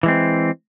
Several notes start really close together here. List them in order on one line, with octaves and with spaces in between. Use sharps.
E3 G#3 C4